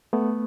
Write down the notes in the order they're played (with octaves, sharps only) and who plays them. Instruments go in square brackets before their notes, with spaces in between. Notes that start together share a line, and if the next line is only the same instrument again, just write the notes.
[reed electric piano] A3 B3